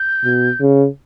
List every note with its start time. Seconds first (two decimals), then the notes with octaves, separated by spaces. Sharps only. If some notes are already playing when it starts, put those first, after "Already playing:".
Already playing: G6
0.24 B2
0.61 C#3